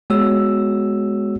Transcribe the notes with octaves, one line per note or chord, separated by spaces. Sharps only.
G#3 B3 F#4 G#4 C#5 E6